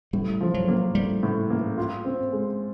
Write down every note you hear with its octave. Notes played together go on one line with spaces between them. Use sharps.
A2 G3
F3
F#3
A#3
A2 G3
A2
A#3
F4
C4
G#3